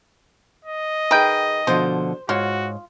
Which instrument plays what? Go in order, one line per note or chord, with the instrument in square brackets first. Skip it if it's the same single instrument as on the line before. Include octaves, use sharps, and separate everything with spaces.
[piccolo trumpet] D#5
[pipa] D#3 G5 [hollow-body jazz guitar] G#4 B4
[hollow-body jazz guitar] B2 D3 F3 [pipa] C5
[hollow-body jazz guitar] G#2 C#5 [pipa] F4 [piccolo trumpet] F#4